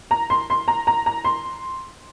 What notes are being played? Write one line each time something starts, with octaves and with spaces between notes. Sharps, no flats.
A#5
C6
C6
A#5
A#5
A#5
C6